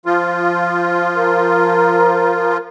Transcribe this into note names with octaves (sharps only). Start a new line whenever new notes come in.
F3 F4
A#4